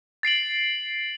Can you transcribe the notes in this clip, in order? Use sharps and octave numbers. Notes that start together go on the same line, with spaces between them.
A6 C7 D7 F#7